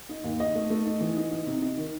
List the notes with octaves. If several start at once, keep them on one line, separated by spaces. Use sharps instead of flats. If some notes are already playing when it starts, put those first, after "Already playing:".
D#4
D#2
D#4 D#5
A3
A3
D#4
E3
D#4
D#4
C3
D#4
D#3